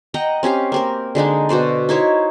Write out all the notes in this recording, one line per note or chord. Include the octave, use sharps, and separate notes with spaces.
D#5 F#5 G5 A#5
C4 C#4 G4 F5
A#3 C4 A#4
D3 G#3 D4 D#4
B2 F#4 C5 D5
D#4 E4 C5 C#5